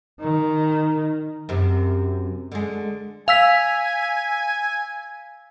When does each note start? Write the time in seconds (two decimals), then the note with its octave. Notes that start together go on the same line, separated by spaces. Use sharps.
0.20 D#3
1.49 F#2 C3
2.52 D3 G#3
3.28 F5 G#5 E6 B6